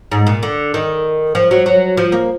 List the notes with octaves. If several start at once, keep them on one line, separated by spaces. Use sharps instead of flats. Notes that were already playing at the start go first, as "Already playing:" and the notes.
G#2
A#2
D3
D#3
F3
F#3
F#3
F3
A#3